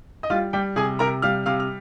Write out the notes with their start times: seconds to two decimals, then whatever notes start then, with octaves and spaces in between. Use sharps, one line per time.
0.23 D#5
0.30 G3 F4 F5
0.53 G3 G4 G5
0.76 C3 G#4 G#5
0.99 C3 A#4 A#5
1.22 G3 F5 F6
1.46 C3 F5 F6
1.60 F6